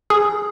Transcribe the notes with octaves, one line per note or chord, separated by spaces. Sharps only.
G#4